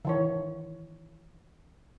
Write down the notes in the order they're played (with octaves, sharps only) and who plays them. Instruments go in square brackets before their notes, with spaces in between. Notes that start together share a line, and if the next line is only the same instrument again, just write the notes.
[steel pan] D#3 E3 C#5